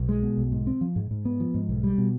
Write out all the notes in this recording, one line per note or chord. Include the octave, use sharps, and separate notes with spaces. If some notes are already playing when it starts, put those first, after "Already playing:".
Already playing: B1
G#3
B2
B1
G#2
C4
F3
G#2
G#2
B3
F3
G#2
B1
G3
B2